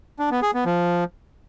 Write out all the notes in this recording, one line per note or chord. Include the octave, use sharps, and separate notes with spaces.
D4
B3
G#4
B3
F3